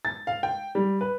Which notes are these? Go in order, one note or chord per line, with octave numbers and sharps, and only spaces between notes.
A6
F5
G5
G3
B4